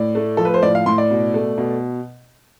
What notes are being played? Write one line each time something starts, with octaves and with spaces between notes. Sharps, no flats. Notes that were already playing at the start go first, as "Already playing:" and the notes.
Already playing: A2 D5
A3
F3 A4
B4
C5
A2 D5
F5
A2 C6
D5
B2
A3
B2